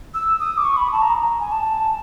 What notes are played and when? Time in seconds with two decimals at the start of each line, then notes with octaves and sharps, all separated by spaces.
0.14 E6
0.40 D#6
0.57 D6
0.64 C#6
0.77 B5
0.92 A5
1.02 A#5
1.40 G#5
1.52 A5
1.65 A5